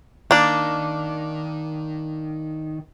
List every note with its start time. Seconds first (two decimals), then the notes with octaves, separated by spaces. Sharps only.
0.31 D#3 A#3 D4